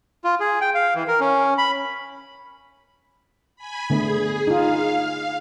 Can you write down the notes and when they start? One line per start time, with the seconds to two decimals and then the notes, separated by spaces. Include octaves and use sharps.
0.24 F4
0.40 G#4
0.61 G5
0.75 F5
0.95 E3
1.08 A#4
1.20 C#4
1.58 B5
3.56 G#5 B5
3.90 D3 A3 B3 G#4
4.47 D#4 F4 F5